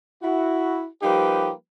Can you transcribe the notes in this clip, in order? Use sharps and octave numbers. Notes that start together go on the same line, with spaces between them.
E4 F#4
F3 G3 A#3 D#4 G4 B4